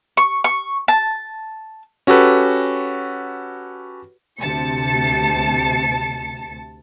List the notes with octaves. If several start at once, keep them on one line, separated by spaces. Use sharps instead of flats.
C#6
C#6
A5
C#4 F#4 G4 A4 B4
D2 C3 A5 C#7